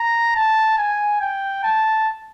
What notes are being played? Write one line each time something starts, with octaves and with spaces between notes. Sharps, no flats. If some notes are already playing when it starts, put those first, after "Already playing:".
Already playing: A#5
A5
G#5
G5
A5